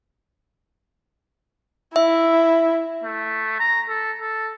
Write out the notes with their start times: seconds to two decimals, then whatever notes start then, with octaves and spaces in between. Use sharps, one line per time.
1.96 E4 E5
3.04 A3
3.60 A#5
3.89 A4
4.19 A4